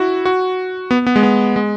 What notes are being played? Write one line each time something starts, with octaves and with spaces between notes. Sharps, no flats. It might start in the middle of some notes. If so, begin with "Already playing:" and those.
Already playing: E4 F#4
F#4
B3
B3
G#3
B3
G#3